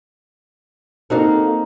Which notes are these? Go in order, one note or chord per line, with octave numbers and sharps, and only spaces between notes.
A#3 C4 D#4 F#4 A4